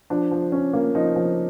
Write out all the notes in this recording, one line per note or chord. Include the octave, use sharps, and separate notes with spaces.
F3 D4
F3
C#4
A#3
F3 D#4
F3